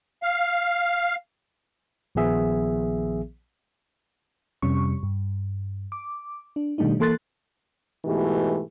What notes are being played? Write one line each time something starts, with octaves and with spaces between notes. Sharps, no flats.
F5
A#1 D#3 F3 B3 G#4 E5
F2 C3 G3 C#4 C#6
G2
D6
D4
B2 D#3 G3 A3 D4 D#4
E3 A#3 A4 C6 F#6 A6
G#2 B2 E3 A3 G4